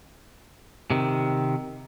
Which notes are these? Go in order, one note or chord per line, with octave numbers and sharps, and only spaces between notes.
C3 D#3